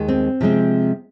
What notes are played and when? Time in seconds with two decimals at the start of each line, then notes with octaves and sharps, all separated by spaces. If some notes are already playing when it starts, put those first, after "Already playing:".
Already playing: D#2 D#3 G#3
0.08 C4
0.41 C3 F3 G#3 C4